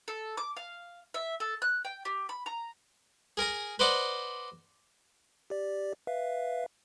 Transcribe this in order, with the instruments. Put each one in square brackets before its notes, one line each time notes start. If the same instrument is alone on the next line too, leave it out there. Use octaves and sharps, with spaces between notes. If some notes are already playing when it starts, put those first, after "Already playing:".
[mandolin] A4
D6
F5
E5
A4
F#6
G5
G4
B5
A#5
[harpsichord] G#4 A#4 G#5 A#5
B4 C5 D5 D#5 F#5 D6
[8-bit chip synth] G4 D5
B4 E5 F5